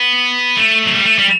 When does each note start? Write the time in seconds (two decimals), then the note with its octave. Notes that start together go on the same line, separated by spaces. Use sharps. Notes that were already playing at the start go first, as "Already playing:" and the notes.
Already playing: B3
0.57 A3
0.85 F#3
0.94 G3
1.04 A3
1.18 G3